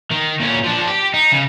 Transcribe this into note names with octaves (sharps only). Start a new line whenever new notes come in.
D#3
A#2 C#4
F3 D4
G4
D#4
C#3